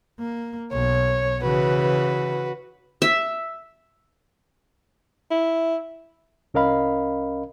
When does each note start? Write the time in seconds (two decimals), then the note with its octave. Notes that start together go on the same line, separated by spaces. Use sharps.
0.19 A#3
0.72 B1 C#5
1.42 C#3 E3 F#4 B4
3.02 E5
5.31 E4
6.54 C2 C#4 A#4 D#5 F5 B5